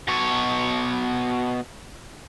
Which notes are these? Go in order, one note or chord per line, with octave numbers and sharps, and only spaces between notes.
B2 C#5